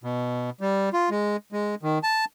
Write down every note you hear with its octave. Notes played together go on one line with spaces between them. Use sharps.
B2
G3
F4
G#3
G#3
D#3
A5